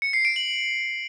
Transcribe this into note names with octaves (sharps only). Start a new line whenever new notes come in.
C#7
C7
D7
F#7